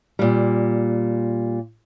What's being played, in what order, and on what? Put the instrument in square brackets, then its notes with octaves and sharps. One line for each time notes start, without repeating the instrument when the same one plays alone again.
[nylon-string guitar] A#2 G3